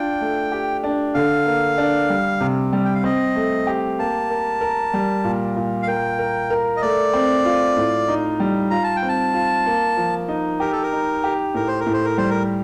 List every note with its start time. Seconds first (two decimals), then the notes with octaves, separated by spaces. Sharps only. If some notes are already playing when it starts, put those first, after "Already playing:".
Already playing: D4 F4 G5
0.21 A3
0.52 G4
0.84 D4
1.14 D3 F5
1.46 A#3
1.78 D4
2.10 G3
2.40 C3
2.73 G3
2.85 G5
2.95 F5
3.04 C4 D#5
3.36 A3
3.67 G4
3.99 A#3 A5
4.30 A#4
4.61 A#4
4.93 G3
5.24 A#2
5.56 A#2
5.83 F5
5.87 A#4 G5
6.19 A#4
6.50 A#4
6.76 D#5
6.82 A3 D5
7.13 C4
7.45 F4
7.76 A2
8.08 D#4
8.40 G3
8.71 F4 A#5
8.84 A5
8.96 G5
9.03 C4
9.09 A5
9.34 F4
9.66 A#3
9.97 F3
10.28 D#4
10.60 G4 A#4
10.72 A4
10.83 A#4
10.92 D#4
11.24 G4
11.54 A2 A#4
11.67 C5
11.80 A#4
11.86 A2
11.93 C5
12.05 A#4
12.17 G3 C5
12.30 A#4